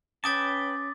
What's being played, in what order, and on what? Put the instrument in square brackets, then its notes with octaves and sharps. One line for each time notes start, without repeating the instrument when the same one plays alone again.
[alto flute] C#4 [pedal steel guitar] B4 G5 A5 [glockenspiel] D6 D#6 A6